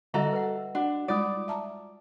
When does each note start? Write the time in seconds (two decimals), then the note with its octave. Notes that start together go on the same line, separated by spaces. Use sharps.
0.14 D3 G3 F#4 A4 D#5 E5 A#5
0.33 B4 F#5
0.75 D4 F#4 F#5
1.08 G3 G#3 D#4 F4 D5 D#6
1.48 E5 A5 A#5